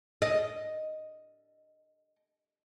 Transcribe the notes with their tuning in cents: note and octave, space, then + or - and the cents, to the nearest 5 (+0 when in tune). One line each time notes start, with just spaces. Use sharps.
D#5 +0